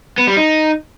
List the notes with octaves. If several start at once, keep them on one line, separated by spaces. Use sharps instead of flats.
B3
G3
D#4